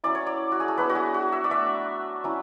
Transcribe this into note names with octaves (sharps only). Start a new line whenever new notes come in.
F#3 C#4 E4 D5
C#5
D5
F#4
G#4
A4
F#3 B3 D4 B4
F#4
G#4
F#4
E5
D5
A3 D4 E5
F#3 C#4 E4